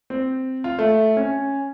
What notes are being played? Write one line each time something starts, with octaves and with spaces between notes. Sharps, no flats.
C4
F4
A3
C#4